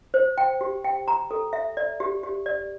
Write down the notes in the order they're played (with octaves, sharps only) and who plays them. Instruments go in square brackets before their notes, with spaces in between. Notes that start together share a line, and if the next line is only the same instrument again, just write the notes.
[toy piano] C5
G5
G4
G5
A#5
A4
E5
D5
G4
G4
D5